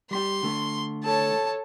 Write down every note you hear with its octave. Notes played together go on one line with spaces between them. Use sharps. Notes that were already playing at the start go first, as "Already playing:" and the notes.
G3 G4 C6
D3 A3
A4 C#5 A5